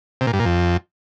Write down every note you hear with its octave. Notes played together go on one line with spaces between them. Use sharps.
C3
A#2
G2
A#2
F2